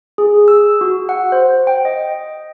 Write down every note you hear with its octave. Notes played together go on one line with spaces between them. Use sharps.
G#4
E6
F#4
F#5
C5
G5
D#5